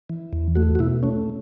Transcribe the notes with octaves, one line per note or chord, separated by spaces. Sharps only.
E3
E2
A3 F#4
F#4
B2 E4
A3 C#4